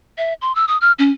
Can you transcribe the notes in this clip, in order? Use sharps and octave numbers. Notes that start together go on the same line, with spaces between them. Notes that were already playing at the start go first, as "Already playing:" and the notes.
E5
C6
E6
D#6
F6
C#4